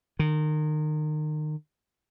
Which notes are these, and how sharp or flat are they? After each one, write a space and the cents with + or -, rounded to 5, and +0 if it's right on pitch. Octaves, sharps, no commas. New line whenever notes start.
D#3 -30